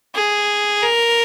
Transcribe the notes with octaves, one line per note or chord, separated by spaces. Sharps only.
G#4
A#4